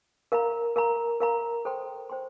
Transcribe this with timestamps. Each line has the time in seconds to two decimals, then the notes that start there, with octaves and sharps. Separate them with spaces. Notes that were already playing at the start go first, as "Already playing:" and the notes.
0.32 A#4 F5 A#5
0.76 A#4 F5 A#5
1.20 A#4 F5 A#5
1.65 A4 C5 G5 C6
2.10 C5 G5 C6